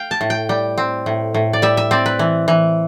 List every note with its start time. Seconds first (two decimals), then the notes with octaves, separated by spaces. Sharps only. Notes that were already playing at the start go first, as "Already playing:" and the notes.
Already playing: F5 G5
0.11 A5
0.21 A2
0.30 G5
0.49 G3 G5
0.78 C4
1.06 A2
1.34 A2
1.53 D5
1.62 G3 E5
1.77 E5
1.91 C4 D5
2.06 B4
2.19 E3
2.48 E3